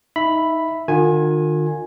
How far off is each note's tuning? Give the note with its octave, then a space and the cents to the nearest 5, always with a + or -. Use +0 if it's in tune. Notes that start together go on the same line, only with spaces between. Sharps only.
D#4 +20 E5 +0 B5 +0
D#3 -40 F4 +40 G#5 +0